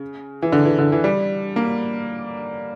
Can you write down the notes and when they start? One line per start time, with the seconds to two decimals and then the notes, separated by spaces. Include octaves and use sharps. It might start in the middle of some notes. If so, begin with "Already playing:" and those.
Already playing: C#3
0.42 E3
0.52 D3
0.65 E3
0.79 D3
0.92 E3
1.04 G3
1.56 A#3